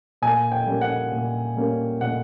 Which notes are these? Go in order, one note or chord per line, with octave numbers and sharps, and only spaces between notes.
A#2 G#5
G5
G3 A#3 C#4
F#5
A#2
G3 A#3 C#4
A#2 F#5